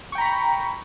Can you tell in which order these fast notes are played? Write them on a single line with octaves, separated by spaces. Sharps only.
C#6 G5 A#5 B5